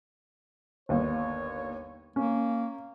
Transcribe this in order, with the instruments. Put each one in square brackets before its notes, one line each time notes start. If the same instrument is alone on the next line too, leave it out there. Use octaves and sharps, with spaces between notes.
[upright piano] G1 D#2 [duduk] C#5
[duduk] A#3 [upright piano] C#4